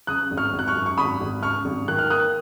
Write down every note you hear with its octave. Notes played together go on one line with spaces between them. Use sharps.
C#3 D#6 F#6
G#1
C#6 F6
G#1
F#6
C#6 F6
F#2
C#6
G#1 B5 D#6
G#1
C#3 C#6 F6
G#1
D#3 F#6
F6
A#3 D#6 F#6